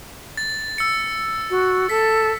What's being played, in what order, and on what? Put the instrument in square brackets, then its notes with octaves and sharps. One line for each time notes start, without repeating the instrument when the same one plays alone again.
[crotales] A6
E6 C#7
[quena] F#4
[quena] A4 [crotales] B6